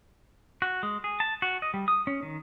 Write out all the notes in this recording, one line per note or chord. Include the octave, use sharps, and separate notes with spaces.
F#4
G#3
G#4
A5
F#4
D#5
G3
D#6
C#4
D#3